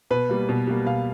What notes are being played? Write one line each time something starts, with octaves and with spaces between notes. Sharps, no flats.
B2 B4
G3 A#3
B2
G3 A#3
B2 F5